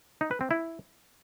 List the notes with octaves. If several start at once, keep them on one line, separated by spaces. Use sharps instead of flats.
D#4
B4
C4
E4